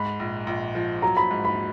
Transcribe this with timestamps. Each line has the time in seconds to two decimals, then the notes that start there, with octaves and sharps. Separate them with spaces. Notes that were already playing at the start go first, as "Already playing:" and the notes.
Already playing: G#2 B5
0.20 A#1
0.47 A#1
0.75 F3
1.02 F#3 A#5
1.17 B5
1.31 G#2
1.45 B5